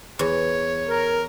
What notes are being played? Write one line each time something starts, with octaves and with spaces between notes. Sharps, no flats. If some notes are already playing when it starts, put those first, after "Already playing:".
E2 C#5
A#4